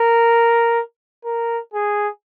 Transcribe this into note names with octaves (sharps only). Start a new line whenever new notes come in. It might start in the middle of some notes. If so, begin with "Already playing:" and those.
Already playing: A#4
A#4
G#4